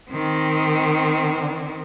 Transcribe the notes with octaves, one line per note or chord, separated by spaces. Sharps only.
D#3 C4